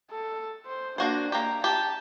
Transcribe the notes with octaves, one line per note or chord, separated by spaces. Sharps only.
A4
C5
A#3 D4 F#4 C5
A#3 G4 A#5
G4 A5